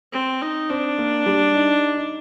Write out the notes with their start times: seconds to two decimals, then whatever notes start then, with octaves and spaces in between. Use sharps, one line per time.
0.13 C4
0.42 D#4
0.69 C4 D4
0.98 A#3
1.26 G3
1.54 D#4
1.97 D#4